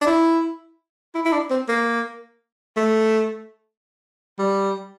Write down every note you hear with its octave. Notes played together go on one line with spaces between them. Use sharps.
D4
E4
E4
E4
D4
C4
A#3
A3
G3